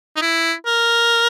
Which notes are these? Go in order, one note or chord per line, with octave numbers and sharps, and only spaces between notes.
D#4
E4
A#4